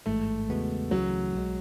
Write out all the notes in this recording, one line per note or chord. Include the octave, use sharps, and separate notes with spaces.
A1 G#2 E3 G#3 A3
E2 C#3 G#3 B3 F#4
C#2 C#3 E3 F#3 A3
B1 B2 G#3